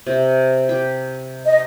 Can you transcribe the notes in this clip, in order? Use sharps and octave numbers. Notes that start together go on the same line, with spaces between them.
C3
G4
D#5